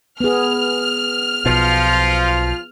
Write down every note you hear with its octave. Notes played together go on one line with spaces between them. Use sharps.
B3 G#4 F6
B1 B2 F3 F4